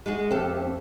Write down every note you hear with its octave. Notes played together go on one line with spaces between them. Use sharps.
G#3 F#4 G#4
F2 C4 G4 A4